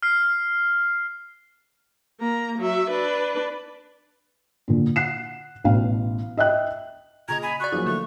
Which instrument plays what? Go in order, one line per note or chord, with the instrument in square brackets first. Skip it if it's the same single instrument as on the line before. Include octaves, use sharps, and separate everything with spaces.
[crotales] F6 C7
[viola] A#3 A#5
F#3 E5
D4 B4
[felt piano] A#2 D3
F#5 F#6 C7 E7
A1 B2 F5
D#5 E5 G5 F#6
[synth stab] A#2 C#3 D#5 [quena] A#5 [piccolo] G#6
[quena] G#5 [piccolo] B5
[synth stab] F#4 D5 [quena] C#6 [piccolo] F#6
[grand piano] F3 F#3 A#3 [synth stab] G#4
[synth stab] D3 A3 [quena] C#6